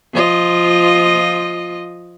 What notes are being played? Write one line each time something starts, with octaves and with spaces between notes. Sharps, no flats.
F3 F4 D#5